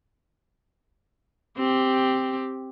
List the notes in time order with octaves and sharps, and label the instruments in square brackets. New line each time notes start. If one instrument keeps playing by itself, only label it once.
[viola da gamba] C4 G4